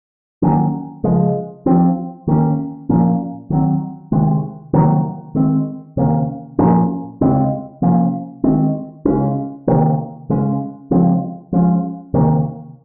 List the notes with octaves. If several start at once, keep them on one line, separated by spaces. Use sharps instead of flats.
D#3 F#3 A#3 C#4
C#3 F3 G#3
F3 C4
D#3 A#3 C#4
A#2 F3 A#3 C#4
D#3 F#3 C4
C3 D#3 G#3
C3 D#3 F#3 A#3
D#3 G#3 C4
C3 D#3 A#3 C#4
A#2 F3 A#3 C#4
C#3 G#3 C4
C3 F3 A#3 C#4
D#3 G#3 C4
C#3 G#3 C#4
C3 D#3 A#3
C#3 G#3 C#4
C#3 F3 G#3 C4
F3 G#3 C#4
C3 D#3 A#3